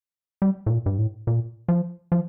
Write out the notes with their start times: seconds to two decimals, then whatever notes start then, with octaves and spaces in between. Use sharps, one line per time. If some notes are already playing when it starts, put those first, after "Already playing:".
0.42 G3
0.66 A2
0.70 A#2
0.86 G2
0.98 A2
1.27 A#2
1.69 F3
2.12 F3